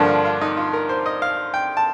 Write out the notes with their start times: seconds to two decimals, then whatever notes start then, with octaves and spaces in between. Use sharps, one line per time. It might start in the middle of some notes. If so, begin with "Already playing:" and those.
Already playing: G2 D3 F3 A#3 D4
0.08 F4
0.25 F4
0.41 D#4
0.57 F4
0.73 A#4
0.89 C5
1.06 D#5
1.22 F5
1.54 G5
1.77 A5